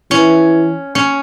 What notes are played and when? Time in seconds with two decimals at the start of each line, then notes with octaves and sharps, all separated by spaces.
0.11 E3 C#4
0.95 C#4